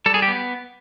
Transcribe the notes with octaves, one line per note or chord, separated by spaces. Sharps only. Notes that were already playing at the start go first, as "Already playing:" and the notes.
G3 A4
G#4
G4
B3